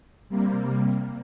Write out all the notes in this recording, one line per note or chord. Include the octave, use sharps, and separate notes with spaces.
C3 G3 A#3